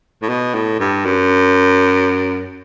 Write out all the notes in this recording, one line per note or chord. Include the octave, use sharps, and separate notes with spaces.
A2
B2
A2
G2
F#2